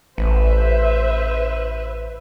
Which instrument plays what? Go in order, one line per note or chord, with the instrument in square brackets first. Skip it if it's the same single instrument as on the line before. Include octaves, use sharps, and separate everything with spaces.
[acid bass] A1 [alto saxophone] B4 [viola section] C5 E5